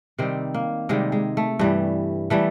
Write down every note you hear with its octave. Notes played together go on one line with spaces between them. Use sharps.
C3 D#3 G3 C4
A#3
C3 D#3 G3 G#3
G#3
A3
G2 E3 G3
E3 G3 A3